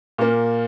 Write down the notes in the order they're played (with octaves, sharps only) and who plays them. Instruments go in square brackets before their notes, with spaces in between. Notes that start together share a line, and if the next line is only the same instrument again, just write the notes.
[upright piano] A#2 A#3